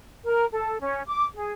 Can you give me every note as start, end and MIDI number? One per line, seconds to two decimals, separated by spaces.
0.25 0.46 70
0.52 0.80 69
0.80 1.01 61
1.06 1.24 86
1.35 1.52 68